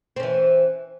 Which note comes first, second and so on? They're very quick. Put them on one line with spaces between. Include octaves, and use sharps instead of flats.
C4 C#4 E3